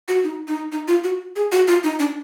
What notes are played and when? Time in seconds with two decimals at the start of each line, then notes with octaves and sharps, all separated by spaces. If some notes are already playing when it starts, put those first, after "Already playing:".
0.08 F#4
0.24 D#4
0.48 D#4
0.72 D#4
0.88 F4
1.04 F#4
1.36 G#4
1.52 F#4
1.68 F4
1.84 D#4
2.00 D4